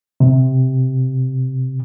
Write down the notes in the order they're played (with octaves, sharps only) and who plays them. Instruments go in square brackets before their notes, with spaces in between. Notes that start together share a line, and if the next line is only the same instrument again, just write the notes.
[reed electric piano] C3